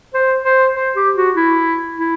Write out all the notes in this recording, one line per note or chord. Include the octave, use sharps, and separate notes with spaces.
C5
C5
C5
G4
F#4
E4
E4